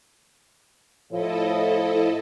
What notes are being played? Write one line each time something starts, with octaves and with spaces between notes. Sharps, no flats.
A2 F3 E4 A4 D#5